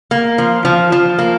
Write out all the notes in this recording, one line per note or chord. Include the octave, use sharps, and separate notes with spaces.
A#3
F3
F3
F3
A#3